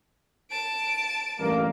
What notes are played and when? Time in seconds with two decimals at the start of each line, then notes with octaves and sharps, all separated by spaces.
0.51 A5 D7
1.39 A1 G2 A#3